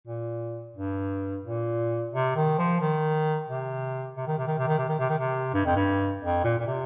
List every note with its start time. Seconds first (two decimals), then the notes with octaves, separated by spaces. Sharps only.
0.08 A#2
0.76 G2
1.45 A#2
2.13 C3
2.36 D#3
2.58 F3
2.80 D#3
3.49 C3
4.17 C3
4.27 D#3
4.38 C3
4.47 D#3
4.58 C3
4.67 D#3
4.78 C3
4.88 D#3
4.99 C3
5.09 D#3
5.19 C3
5.54 G2
5.65 F2
5.76 G2
6.22 F2
6.44 A#2
6.59 A#2
6.67 C3